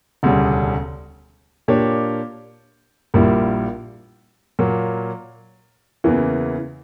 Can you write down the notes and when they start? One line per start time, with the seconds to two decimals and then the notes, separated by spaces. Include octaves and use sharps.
0.23 E1 D2 C#3 G3 C#4
1.68 A#2 A#3 D4 G4 C#5
3.14 A#1 A#2 G3 A#3 E4
4.59 A#2 F#3 A#3
6.04 E2 C#3 E3 A#3